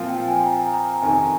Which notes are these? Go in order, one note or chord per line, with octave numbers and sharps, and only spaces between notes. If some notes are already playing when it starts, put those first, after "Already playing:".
Already playing: A#2 F3 C4 F4 F5
G5
G#5
A#5
A#5
F2 C3 D#3 G#5